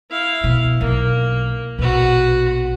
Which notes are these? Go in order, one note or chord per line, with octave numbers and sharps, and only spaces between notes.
E4 F5
B2
B1 A#3
A#1 B2 F#4 B4